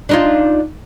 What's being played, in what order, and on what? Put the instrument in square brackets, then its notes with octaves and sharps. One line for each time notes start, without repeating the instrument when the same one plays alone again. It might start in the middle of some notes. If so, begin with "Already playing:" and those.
[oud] D4 D#4 F4